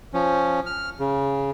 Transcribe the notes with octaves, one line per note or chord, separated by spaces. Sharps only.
F3 C#4
F6
C#3